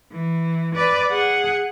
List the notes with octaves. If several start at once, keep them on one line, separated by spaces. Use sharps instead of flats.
E3
B4 D5
G#4 F#5